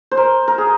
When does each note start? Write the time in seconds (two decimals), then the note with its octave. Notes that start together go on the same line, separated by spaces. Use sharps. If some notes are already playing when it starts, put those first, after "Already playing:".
0.11 C5
0.17 A#4
0.48 A#4
0.58 G#4